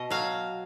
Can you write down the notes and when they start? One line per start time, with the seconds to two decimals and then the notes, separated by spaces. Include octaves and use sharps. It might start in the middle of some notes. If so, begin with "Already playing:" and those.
Already playing: B2 D#5
0.10 F#3 F5